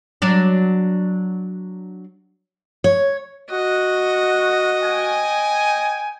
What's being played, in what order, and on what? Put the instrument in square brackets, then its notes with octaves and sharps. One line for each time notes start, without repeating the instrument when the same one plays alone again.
[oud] F#3 D4 D5
[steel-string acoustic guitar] C#5
[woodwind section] F#4 [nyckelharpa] D#5
[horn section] G5 G#5